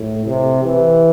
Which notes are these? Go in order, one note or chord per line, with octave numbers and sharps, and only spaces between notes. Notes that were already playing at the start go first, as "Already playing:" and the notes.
Already playing: A2
C3
E3